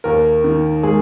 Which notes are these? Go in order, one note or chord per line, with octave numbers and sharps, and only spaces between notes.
D#2 A#4
D#3
G#3 G#4